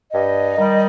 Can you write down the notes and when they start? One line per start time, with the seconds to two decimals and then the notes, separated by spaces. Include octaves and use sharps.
0.13 G2 D#5
0.57 D#3 G3